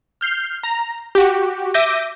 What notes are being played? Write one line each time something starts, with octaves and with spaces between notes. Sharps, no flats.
F6 G6 C7
A#5
F#4 G4
E5 D6 G6 A#6 D#7